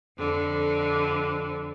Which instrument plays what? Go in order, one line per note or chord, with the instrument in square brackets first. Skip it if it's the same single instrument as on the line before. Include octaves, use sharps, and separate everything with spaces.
[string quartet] F2 D3